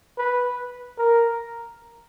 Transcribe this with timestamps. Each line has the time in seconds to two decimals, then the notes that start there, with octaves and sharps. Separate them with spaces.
0.18 B4
0.98 A#4